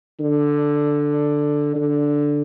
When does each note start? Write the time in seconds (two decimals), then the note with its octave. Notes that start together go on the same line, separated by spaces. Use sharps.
0.20 D3
1.75 D3